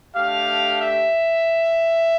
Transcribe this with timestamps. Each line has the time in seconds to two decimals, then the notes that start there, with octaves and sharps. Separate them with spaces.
0.15 A3 D4 G4 F5
0.80 E5